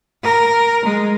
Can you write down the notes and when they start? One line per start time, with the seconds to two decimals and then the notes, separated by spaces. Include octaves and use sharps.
0.23 A#4
0.85 G#3